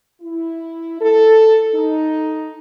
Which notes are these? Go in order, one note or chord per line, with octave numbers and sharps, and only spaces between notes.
E4
A4
D#4